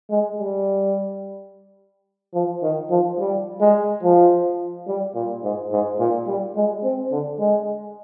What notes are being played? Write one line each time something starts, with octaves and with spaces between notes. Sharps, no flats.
G#3
G3
F3
D#3
F3
G3
G#3
F3
G3
A#2
G#2
G#2
A#2
G3
G#3
C4
D3
G#3